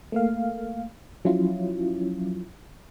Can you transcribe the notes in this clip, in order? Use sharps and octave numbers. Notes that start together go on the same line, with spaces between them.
A3 A#3 F5
F3 F#3 C#4 E4 F4